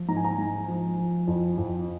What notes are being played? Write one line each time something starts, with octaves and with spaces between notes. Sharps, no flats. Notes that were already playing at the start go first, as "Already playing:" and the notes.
Already playing: F3
G#2 A#5
G#5
A#5
G#2 G#5
F3
F3
F2
F2